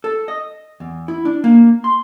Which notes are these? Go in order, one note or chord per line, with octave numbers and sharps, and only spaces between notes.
A4
D#5
E2
E4
D4
A#3
C6